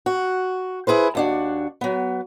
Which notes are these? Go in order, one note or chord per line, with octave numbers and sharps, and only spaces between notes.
F#4
E4 G#4 B4 C5
D#2 D4 F#4
F#3 B3